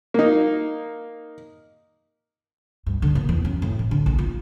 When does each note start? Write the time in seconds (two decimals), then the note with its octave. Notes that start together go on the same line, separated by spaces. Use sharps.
0.14 A#3 D#4
2.86 G2
3.02 D3
3.15 A#2
3.29 E2
3.45 F#2
3.62 A2
3.79 A1
3.91 D3
4.06 A#1
4.18 F4